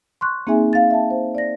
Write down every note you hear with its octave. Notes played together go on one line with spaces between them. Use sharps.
C6 C#6 F#6
A#3 C4 D#4 G#4 E5 G#5
F5 A6
E5 A5
C5
D5 A#6